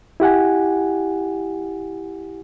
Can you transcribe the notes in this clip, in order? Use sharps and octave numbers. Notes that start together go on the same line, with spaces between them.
E4 G4 F#5 G#5